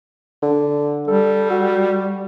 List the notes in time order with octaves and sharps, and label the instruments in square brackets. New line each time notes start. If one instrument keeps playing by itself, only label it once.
[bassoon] D3
[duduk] G3 [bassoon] A4
[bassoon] F#4